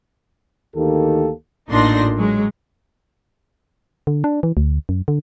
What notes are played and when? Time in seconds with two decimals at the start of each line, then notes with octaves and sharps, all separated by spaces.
0.76 D2 D#3 A#3 G4 A4
1.69 A1 A#2 D4 D#4 C6 A#6
2.17 F#3 G#3
4.07 D3
4.24 D4
4.43 E3
4.57 D2
4.89 F#2
5.08 D3